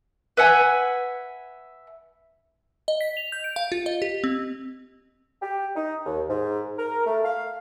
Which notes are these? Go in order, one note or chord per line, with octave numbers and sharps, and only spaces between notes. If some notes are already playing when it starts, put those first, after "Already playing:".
B4 E5 F#5 G#5
D#5
B6
F7
G6
D7
F5
F4
D#5
G4
C4
G4
D#4
D#2
G#2
A#4
A3
F5